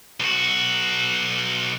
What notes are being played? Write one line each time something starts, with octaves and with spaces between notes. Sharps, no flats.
B1 F#4